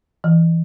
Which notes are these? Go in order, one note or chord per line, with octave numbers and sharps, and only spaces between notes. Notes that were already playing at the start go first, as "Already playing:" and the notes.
E3